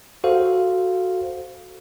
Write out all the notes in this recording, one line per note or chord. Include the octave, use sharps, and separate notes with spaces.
F#4 A4 C5 F5